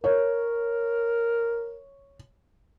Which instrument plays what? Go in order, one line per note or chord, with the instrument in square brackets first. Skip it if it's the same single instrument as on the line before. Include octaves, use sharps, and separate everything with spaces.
[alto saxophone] A#4 [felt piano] C#5